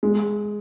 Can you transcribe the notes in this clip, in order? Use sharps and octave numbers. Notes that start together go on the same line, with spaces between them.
G#3